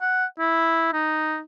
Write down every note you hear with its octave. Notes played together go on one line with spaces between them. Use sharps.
F#5
E4
D#4